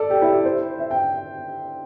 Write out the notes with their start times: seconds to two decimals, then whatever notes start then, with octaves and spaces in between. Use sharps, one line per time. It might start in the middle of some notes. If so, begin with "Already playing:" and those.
Already playing: A4 D5
0.10 G4
0.22 E4
0.33 G4
0.45 C5
0.79 E5
0.91 G5